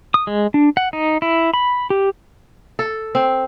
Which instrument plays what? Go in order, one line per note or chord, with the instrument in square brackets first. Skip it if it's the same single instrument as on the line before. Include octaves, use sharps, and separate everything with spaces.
[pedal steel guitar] D#6
G#3
D4
F#5
D#4
E4
B5
G4
[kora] A4
C4